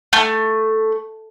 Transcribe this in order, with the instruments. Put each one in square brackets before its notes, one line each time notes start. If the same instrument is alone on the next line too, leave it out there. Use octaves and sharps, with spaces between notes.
[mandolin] A3